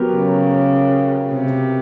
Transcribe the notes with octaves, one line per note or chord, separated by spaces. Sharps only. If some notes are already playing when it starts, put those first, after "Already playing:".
Already playing: F#3 B3 G4 A#4
C#3
C3